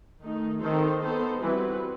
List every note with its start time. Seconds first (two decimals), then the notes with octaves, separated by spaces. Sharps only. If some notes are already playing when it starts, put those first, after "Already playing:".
0.23 D#3 A3 D#4
0.62 D#3 C4 D#4 A4 C5
1.02 B3 D#4 A4 C5
1.41 E3 G3 C4 F#4 B4